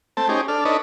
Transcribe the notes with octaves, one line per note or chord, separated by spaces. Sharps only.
A3 C4 A5
C#4 D#4 G4 G#4 C5
D4 A4 F6
D4 D#4 A4 B4 C#5 D#5